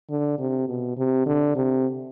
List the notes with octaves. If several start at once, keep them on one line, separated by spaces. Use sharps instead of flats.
D3
C3
B2
C3
D3
C3